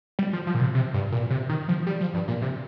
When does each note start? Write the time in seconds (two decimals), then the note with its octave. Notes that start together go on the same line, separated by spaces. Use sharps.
0.19 G3
0.33 F3
0.47 F3
0.55 A#2
0.60 C3
0.75 C3
0.94 G2
1.12 A#2
1.30 C3
1.49 D#3
1.68 F3
1.87 G3
2.01 F3
2.14 G2
2.28 A#2
2.42 C3